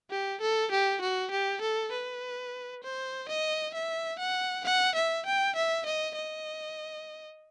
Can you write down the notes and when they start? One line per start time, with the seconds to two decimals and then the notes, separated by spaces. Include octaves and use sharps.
0.11 G4
0.41 A4
0.71 G4
1.02 F#4
1.31 G4
1.61 A4
1.92 B4
2.84 C5
3.29 D#5
3.75 E5
4.19 F#5
4.65 F#5
4.95 E5
5.26 G5
5.56 E5
5.86 D#5
6.16 D#5